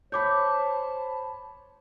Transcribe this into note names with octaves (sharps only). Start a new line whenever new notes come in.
C5 C#5 A5 B5 D6 G6